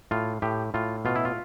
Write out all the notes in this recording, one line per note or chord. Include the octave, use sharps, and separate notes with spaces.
A2 F4
A2 G4
A2 F4
B2 F4
E4
F4